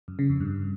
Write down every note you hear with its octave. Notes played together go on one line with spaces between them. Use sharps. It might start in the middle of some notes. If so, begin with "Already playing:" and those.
F#2
C#3
F2
G2